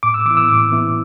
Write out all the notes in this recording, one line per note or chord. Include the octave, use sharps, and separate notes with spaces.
A2 D6
E6
E3 B3 E4 D6
E6
A2 D6
E3 B3 E4